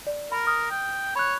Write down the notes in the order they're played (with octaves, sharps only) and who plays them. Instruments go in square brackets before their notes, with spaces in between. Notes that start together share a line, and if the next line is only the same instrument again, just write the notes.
[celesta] D5
[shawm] A#4 [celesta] B5
[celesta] D#6 F6
[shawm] G5
[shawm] C#5 [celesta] B5 F#6